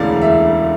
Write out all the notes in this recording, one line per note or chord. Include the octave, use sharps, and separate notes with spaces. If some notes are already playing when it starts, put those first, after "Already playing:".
Already playing: E1 D2 C#3 E3 D5 F5
E5